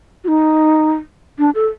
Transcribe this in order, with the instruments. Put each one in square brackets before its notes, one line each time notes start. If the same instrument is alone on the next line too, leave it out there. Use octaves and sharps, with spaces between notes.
[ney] F#4
D#4
D4
A4